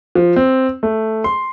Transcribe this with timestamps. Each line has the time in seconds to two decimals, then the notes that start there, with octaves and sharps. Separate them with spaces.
0.15 F3
0.36 C4
0.83 A3
1.24 C6